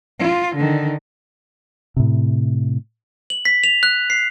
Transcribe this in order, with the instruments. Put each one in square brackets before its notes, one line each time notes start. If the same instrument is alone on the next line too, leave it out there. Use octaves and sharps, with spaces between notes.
[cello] F4
D3 D#3
[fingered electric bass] A2 C3
[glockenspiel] F#7
B6
F7
F#6
C7